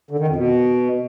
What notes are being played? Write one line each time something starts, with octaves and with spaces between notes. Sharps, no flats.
D3
D#3
F2
B2